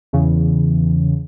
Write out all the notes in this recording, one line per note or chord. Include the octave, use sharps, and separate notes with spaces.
E2 C#3 E3